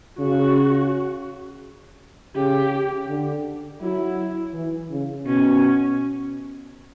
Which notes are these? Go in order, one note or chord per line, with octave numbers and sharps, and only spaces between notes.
C#3 F#4
C#3 G4
D3
F#3 E4
E3
C#3
B2 C#4